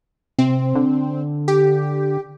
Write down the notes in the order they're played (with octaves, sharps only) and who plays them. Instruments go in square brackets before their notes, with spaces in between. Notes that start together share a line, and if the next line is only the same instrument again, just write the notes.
[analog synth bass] C3 [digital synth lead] C4
[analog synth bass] D3
[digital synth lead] G4